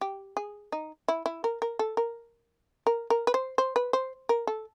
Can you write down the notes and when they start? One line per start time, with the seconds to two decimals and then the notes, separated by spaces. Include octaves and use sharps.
0.01 G4
0.37 G#4
0.72 D#4
1.08 E4
1.26 E4
1.44 A#4
1.62 A#4
1.79 A4
1.97 A#4
2.87 A#4
3.10 A#4
3.27 B4
3.34 C5
3.58 C5
3.76 B4
3.93 C5
4.29 A#4
4.47 A4